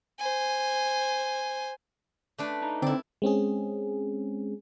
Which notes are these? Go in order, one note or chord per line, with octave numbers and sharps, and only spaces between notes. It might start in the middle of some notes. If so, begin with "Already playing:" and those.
C5 G#5
A3 D4 B4
D#4 D#5 A#5
D3 C4 E4 D5
G#3 C4 C#4 G#4